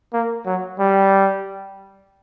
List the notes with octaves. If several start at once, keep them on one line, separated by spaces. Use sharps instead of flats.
A#3
F#3
G3